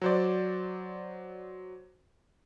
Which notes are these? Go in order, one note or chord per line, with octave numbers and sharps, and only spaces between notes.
F#3 C5 D5